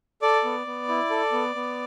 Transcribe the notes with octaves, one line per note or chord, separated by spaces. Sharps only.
A4 D5 D6
B3
B3
E4
A4
B3
B3